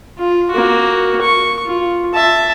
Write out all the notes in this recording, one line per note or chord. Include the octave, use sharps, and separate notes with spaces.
F4
A#3 F#4
C#6
F4
E5 A5